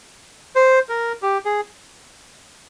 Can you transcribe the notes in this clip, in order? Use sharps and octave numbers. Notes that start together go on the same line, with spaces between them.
C5
A#4
G4
G#4